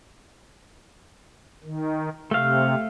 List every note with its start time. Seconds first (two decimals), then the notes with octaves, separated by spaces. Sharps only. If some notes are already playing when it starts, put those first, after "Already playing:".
1.64 D#3
2.31 C3 A3 F5